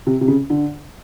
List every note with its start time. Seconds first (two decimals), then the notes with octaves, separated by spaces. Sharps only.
0.07 C3
0.21 C3
0.28 C#3
0.50 D3